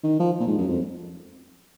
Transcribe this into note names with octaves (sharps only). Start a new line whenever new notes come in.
D#3
F3
A#2
G#2
F#2
F2